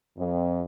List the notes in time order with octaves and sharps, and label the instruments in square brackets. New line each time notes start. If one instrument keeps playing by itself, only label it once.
[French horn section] F2